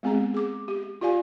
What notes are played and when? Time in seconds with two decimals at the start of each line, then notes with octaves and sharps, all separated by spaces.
0.03 G#3 B3 C4 G#4 A#5
0.34 G#4 D6
0.68 G4
1.01 F4 G4 D5 F5 G#5